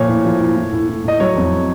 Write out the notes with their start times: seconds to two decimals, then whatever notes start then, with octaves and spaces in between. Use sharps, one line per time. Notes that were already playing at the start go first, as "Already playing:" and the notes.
Already playing: A#2 F3 C#5
0.08 A2
0.25 F3
0.40 A2
0.56 A2
0.72 A2
0.88 A2
1.04 A2 D#5
1.20 F#3 C#5
1.36 F2